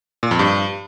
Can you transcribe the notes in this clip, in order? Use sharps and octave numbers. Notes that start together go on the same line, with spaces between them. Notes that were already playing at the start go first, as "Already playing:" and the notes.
A#2
F2
G2